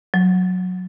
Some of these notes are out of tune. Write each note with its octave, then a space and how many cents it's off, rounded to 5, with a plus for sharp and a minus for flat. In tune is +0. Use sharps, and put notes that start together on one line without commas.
F#3 -15